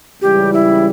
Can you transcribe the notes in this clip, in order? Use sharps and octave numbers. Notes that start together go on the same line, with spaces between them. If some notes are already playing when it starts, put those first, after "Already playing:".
C#2 C#3 E3 G3 G4
E4